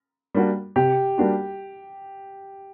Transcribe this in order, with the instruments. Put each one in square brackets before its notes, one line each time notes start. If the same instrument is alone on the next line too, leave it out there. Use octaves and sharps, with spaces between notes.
[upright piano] G3 A#3 D4 F#4
[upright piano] C3 [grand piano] G4
[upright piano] G3 A#3 D4 F#4